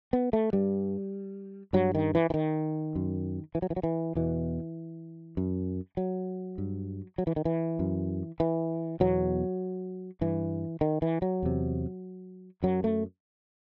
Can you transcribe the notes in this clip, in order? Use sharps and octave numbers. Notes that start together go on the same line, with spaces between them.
B3
A3
G2 G3
G2 F#3
D#3
E3
E3
D#3
F#2
E3
F#3
E3
F#3
E3
E2 B2 E3
F#2
F#3
G2
F#3
E3
D#3
E3
F#2
E3
E2 B2 F#3
G2 E3
D#3
E3
F#3
E2 C3
F#2 F#3
A3